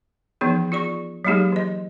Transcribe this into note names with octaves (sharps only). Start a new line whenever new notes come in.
E3 F3 B3 D#4 G#4
F4 G#4 D5 C#6
F#3 G#3 A#3 D#4 G4 G#4
E3 D#5